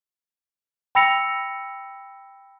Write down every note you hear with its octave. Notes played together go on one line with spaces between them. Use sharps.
G5 B5 E6 A#6 C#7 F7